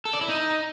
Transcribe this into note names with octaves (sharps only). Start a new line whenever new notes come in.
A4
D5
E4
D#4